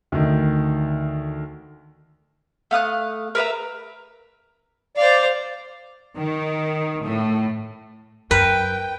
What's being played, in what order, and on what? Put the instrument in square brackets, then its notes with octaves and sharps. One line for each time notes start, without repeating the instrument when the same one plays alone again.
[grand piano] D2 D#3
[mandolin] A3 F5 D#6 F#6
A#4 B4 E5 A#5
[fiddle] C5 F5 [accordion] D5
[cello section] D#3
A2
[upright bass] F#2 [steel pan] A#4 [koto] B4 [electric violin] G5